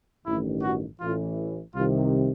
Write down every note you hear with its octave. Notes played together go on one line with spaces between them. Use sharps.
A1 G2 D#3 E4
F#4
A1 A2 E3 F4
C2 C3 D#3 F4